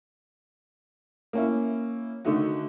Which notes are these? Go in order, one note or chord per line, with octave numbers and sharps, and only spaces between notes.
A#3 C#4 E4
D3 D#3 A3 D#4 F#4